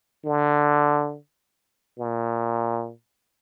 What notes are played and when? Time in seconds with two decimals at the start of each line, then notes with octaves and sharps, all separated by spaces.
0.24 D3
1.99 A#2